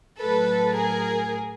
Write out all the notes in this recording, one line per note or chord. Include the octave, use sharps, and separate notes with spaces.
A2 F#3 A4 B4
G#4 A#4